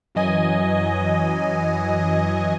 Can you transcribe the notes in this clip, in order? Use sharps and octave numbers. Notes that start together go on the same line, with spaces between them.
F#2 E3 F#3 D#5 G#5